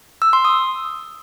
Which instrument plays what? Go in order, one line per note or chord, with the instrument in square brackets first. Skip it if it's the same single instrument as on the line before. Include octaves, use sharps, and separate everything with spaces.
[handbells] E6
C6
D#6